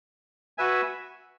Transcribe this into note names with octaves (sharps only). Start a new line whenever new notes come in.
F#4 B4 E5 G#5